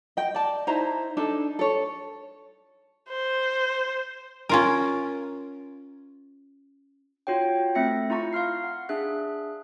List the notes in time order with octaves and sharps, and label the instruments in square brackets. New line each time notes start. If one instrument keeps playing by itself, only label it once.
[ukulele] D#5 G5
D5 A5
D#4 E4 C5 A#5
D4 D#4 A4
A4 C#5
[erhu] C5
[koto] C#4 F4 A#4
[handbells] F4 F#4 C#5 G5
A3 C4 E5 A#6 C#7
E4 F4 A#5 C#6
F5 C6 F6 C7
F#5
D4 G#4 E5 F#6